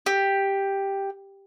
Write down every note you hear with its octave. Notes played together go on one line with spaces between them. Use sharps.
G4